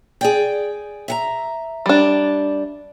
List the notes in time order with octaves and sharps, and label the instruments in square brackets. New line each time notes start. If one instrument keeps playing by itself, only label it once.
[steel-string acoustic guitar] G#4 D5 G5
E5 F#5 A#5
[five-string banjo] G3 D4